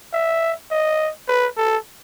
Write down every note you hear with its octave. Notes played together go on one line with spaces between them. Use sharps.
E5
D#5
B4
A4